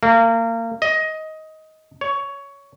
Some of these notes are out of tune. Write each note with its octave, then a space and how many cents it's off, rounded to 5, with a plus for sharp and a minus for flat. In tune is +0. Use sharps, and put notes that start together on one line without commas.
A#3 -30
D#5 +15
C#5 +15